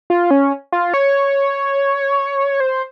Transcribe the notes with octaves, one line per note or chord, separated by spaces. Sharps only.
F4
C#4
F4
C#5
C5